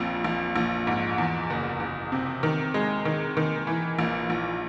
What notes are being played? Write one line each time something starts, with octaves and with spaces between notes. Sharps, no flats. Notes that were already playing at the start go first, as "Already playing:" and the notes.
Already playing: A#1 F2
A#1
A#1
G#2
E2
F#1
F#1
C3
D#3
G#3
D#3
D#3
E3
A#1
A#1